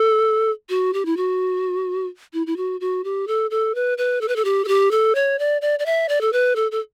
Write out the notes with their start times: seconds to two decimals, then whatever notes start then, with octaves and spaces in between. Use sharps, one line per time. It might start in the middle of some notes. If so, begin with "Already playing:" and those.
Already playing: A4
0.69 F#4
0.93 G4
1.06 E4
1.17 F#4
2.33 E4
2.47 E4
2.57 F#4
2.81 F#4
3.04 G4
3.28 A4
3.51 A4
3.75 B4
3.98 B4
4.21 A4
4.28 B4
4.36 A4
4.45 G4
4.65 A4
4.68 G4
4.91 A4
5.15 C#5
5.39 D5
5.61 D5
5.79 D5
5.86 E5
6.09 D5
6.21 A4
6.33 B4
6.56 A4
6.72 A4